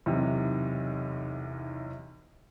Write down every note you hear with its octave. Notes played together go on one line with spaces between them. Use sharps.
B1 E2 C3 D#3